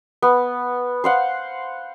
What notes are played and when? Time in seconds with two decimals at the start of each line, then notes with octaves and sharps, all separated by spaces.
0.22 B3
1.04 C5 F5 F#5